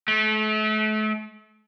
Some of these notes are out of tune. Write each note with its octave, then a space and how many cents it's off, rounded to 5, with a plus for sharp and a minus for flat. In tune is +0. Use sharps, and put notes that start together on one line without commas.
A3 -35